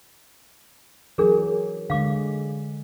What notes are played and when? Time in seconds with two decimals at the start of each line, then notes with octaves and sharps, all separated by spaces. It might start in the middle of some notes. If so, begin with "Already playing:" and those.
1.18 E3 F#3 D4 G#4 A#4
1.90 D3 G#3 F5 D6